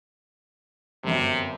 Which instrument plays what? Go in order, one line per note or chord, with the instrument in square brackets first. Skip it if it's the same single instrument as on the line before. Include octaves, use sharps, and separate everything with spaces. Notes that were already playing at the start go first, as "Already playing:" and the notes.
[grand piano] G1 F#2 [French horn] C3